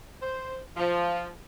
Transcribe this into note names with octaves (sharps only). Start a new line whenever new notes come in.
C5
F3